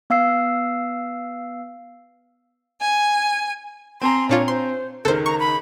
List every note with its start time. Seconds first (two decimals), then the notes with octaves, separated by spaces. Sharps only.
0.10 B3 F5 E6 C7
2.80 G#5
4.01 C4 G#5 A#5 C6
4.29 A#2 D4 F4 C#5
4.48 C5 C6
5.05 C#2 D#3 A4 A#4 C5
5.26 A#5 C#6
5.39 B5